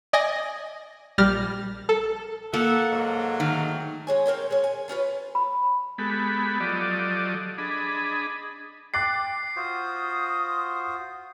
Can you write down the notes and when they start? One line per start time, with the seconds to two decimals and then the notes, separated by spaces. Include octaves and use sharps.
0.13 D5 D#5 G#5 D#6 A#6
1.18 A#1 G3 F6 A6 A#6
1.89 A4
2.54 A#3 A4 E5 F#5
2.92 G#2 F#3
3.40 D#3 A3 D#4
4.07 G#3 C#5 G#5
4.26 C4 A#4 C#5 G5
4.51 G#3 C#5
4.64 G#5
4.88 A3 C#4 F4 B4
5.35 B5
5.98 G#3 B3 G4 A4 B5
6.60 F3 F#3 G4 A4 D5 D#5
7.58 D4 G#4 D#5 B5
8.94 G5 D6 F#6 A6 C7
9.56 F4 F#4 C5 D#6